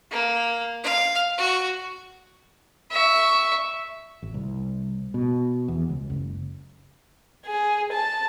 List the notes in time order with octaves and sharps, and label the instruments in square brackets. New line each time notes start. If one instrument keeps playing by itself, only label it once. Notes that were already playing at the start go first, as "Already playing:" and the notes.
[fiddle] A#3
F5
F#4
E5 C#6
[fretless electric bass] G#1
C2
B2
E2
C#2
F#1
[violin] G#4
A5